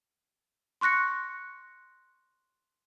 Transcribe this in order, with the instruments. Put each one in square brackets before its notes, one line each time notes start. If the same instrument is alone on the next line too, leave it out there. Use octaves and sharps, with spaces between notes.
[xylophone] C6 C#6 F#6 A#6 C#7